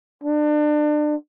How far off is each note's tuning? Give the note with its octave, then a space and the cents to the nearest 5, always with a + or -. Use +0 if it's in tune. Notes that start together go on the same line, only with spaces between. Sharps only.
D4 +30